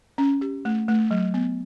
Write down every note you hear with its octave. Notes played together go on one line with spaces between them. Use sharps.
C#4
G4
A3
A3
F#3
B3